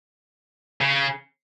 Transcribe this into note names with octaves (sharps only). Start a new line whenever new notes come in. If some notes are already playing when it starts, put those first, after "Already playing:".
C#3